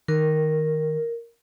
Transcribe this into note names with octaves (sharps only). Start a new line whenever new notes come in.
D#3 A#4